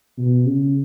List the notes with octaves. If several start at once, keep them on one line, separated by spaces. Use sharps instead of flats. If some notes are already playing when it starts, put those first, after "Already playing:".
B2
C#3